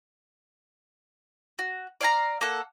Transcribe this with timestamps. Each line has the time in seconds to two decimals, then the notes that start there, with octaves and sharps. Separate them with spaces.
1.59 F#4
2.01 D5 F5 G#5 A#5
2.41 A#3 A4 F#5